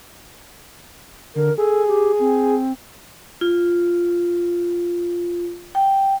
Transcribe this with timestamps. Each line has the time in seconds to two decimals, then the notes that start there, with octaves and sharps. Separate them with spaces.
1.36 D3 A#4
1.58 G#4 A4
1.87 G4
2.20 C4
3.41 F4
5.75 G5